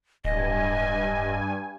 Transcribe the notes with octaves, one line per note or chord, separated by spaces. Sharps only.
D1 G2 D#5 G#5